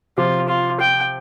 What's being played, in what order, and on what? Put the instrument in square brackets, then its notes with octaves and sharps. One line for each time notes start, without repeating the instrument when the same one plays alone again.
[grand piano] C3 F3 [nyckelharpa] F4
[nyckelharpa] F4
G5